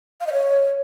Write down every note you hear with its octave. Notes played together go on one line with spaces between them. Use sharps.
F5
D#5
C#5